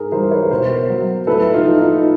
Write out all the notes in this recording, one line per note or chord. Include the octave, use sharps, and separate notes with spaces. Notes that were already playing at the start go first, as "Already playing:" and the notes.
Already playing: G#2 G#4 A#4
E3 G3 A#4 C5
B4 C#5
B2 A#4 C5
F#3
A2 A4 B4
D#4 F4
F3
D#4 F4